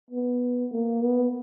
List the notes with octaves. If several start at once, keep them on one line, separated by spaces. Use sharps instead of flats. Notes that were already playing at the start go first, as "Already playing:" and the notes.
B3
A#3
B3